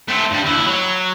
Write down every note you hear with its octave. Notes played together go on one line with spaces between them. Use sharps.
A3 C4
G2 G3
D#2 E4
F#3